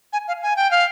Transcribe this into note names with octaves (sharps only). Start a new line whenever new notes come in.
G#5
F5
G#5
G5
F5